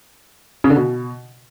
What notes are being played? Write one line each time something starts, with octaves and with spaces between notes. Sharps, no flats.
C#3
D3
B2